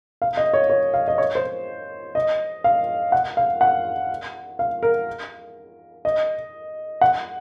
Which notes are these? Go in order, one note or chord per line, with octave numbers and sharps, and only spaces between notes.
F5
D#5
C#5
C#5
F5
D#5
C#5
C5
D#5
F5
F#5
F5
F#5
F5
A#4
D#5
F#5